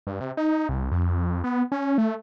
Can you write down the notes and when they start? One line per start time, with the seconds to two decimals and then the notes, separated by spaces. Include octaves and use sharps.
0.07 G2
0.20 C3
0.37 D#4
0.69 C2
0.92 F2
1.44 B3
1.72 C#4
1.98 A3